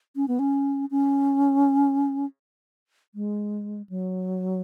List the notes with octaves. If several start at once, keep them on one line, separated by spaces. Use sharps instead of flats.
C#4
B3
C#4
C#4
G#3
F#3